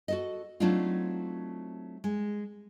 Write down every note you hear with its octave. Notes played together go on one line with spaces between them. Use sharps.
F#4 A4 D#5
F#3 A3 C4 D4 D#4 F4
G#3